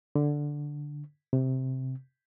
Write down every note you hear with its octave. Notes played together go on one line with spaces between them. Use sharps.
D3
C3